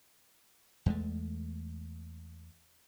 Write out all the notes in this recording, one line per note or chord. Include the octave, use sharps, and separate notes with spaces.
E2 G#3 A3